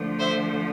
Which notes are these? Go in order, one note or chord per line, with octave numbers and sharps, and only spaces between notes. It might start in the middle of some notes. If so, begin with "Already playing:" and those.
Already playing: D3 F3 A3
C5 E5